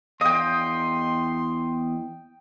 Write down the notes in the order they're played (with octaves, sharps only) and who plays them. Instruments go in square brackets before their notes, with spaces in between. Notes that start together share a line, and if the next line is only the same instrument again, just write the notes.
[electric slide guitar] E2 D#5 F5 [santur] G5 D#6 [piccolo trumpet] C6